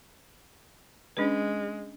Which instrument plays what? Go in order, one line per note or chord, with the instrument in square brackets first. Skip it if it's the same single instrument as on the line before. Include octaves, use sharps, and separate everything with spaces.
[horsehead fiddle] G#3 [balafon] C#4 D4 B4